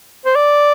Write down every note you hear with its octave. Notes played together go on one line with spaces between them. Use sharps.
C5
D5